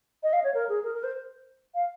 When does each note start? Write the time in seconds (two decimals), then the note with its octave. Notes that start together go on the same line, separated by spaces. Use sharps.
0.23 D#5
0.33 F5
0.44 C#5
0.54 A#4
0.69 G#4
0.84 A#4
0.95 A#4
1.04 C5
1.75 F5